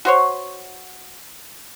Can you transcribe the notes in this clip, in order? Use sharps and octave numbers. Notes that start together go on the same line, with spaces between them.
F#4 C5 C#5